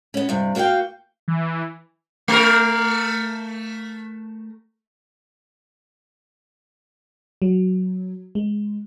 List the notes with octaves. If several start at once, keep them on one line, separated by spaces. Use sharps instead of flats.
B3 C#4
G2 C3
A#3 F#4 G#4 F5 G5
E3
A3 A#4
F#3
G#3